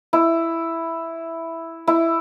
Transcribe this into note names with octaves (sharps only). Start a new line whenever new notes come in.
E4
E4